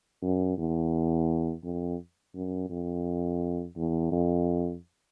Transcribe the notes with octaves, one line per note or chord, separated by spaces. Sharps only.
F#2
E2
F2
F#2
F2
E2
F2